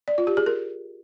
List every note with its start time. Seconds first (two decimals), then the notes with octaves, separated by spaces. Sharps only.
0.08 D5
0.18 F4
0.27 G4
0.37 G#4
0.46 A#4